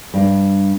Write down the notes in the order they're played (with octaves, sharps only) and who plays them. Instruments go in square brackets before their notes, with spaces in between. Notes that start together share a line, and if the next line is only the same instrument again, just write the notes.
[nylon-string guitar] G2